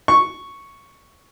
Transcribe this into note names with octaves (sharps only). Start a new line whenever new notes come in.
C#6